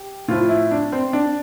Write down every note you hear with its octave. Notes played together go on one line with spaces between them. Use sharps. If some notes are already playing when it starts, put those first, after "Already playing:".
Already playing: G4
A2 F3 F4
E4
D4
C4
D4